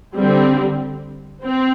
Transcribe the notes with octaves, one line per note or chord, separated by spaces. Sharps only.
D3 G3 C4
C4